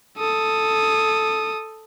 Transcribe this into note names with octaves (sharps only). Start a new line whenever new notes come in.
A4 D#6